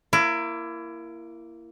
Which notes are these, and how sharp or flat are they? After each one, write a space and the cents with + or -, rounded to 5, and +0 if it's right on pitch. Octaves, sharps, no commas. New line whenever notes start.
A#3 +0 E4 +25